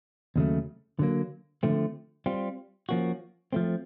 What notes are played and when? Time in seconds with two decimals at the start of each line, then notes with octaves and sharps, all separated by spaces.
0.36 D#2 C#3 F#3 A3
0.99 D3 F#3 A#3
1.63 D3 F3 A3 C4
2.26 G3 C4 F4
2.89 F3 A#3 C#4 F#4
3.53 F3 A3 C4